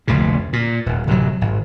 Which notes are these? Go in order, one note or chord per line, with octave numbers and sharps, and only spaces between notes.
F1 D2 A#2 C#3
A#2
D#1
D1 C3 F#3
G#1